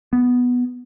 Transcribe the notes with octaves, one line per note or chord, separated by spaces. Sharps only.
B3